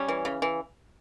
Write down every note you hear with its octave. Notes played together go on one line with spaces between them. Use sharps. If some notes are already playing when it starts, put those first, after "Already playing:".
Already playing: G3 C#4
E3
C#3
E3